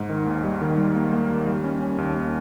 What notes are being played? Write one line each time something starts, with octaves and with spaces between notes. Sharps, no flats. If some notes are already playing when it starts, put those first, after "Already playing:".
Already playing: G#2
D#3
D#2
G3
D#3
G3
A#3
A#3
D#2
G3
C#4
C#4
D#2
D#2